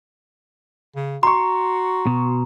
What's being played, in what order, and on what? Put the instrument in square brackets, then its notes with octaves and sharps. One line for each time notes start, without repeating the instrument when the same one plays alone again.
[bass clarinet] C#3
[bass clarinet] F#4 [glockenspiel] A#5 [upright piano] C6 C#6
[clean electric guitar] B2